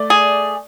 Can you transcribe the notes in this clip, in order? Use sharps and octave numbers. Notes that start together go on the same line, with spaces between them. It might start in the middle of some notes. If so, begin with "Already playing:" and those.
Already playing: A3 D5
G#4